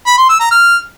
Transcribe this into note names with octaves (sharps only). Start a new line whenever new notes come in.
B5
C6
E6
A#5
F6